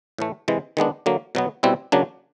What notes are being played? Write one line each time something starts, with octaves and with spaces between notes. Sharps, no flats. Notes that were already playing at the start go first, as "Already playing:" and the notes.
A2 E3 A3
C3 E3 G#3
D#3 G#3 B3 D4
D3 F#3 A#3
B2 F#3 B3
B2 G3 C4 E4
C#3 F#3 A#3 D4